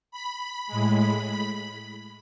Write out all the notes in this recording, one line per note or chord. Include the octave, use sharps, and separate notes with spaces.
B5
B5
A2 G#3 B5
B5
B5